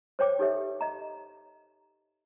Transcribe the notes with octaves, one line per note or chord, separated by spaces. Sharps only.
C5 C#5 G5 D6
D#4 G4 A4 B4 C#5 E5
D#5 A#5